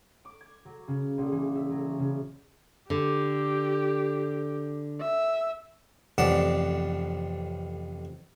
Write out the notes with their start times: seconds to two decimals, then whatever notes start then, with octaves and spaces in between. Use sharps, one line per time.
0.25 D6
0.41 G#6
0.65 F#3
0.88 C#3
1.18 A#1
1.32 E3
1.55 E5
1.70 F#3
1.99 C#3
2.90 D3 G4
5.01 E5
6.18 A1 F2 C3 D5 F#5 A5